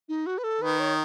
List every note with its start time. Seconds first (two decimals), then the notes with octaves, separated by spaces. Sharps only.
0.09 D#4
0.26 F#4
0.38 B4
0.44 A4
0.62 D#3 B4
0.80 C#5